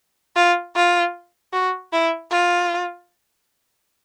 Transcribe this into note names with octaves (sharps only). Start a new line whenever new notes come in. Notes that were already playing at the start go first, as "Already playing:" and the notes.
F4
F4
F#4
E4
F4